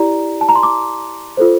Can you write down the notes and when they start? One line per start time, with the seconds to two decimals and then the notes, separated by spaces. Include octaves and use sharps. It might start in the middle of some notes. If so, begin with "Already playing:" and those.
Already playing: E4 G4 D5 A#5
0.41 A5
0.49 A#5
0.56 C6
0.63 D6
1.37 F4 A4 C5